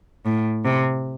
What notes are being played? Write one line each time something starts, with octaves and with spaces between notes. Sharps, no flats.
A2
C3